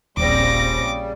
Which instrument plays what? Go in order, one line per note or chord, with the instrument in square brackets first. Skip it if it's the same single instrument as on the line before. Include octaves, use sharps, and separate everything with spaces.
[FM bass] D#1 [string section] A#1 C4 A#6 [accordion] C#3 G3 [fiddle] D6